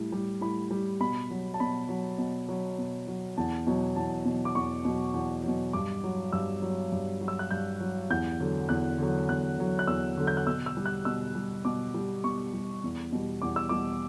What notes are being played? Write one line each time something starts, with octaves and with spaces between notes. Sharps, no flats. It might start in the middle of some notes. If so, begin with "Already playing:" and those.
Already playing: A2 G3
G3
A2 B5
G3
B2 B5
F#3
A5
B2 B5
F#3
B2
F#3
B2
F#3
E2 A5
B2 F#3
E2 A5
B2 F#3
D6
E2 C#6
B2 F#3
E2
B2 F#3
G2 D6
F#3
G2 E6
F#3
G2
F#3
E6
F#6
G2 G6
F#3
E2 G6
D3 F#3
E2 F#6
D3 F#3
E2 F#6
D3 F#3
F#6
E2 E6
D3 F#3
G6
F#6
B2 E6
E6
G3
F#6
B2 E6
G3
B2 D6
G3
B2 C#6
G3
E2
B2 G3
E2 D6
E6
B2 G3 D6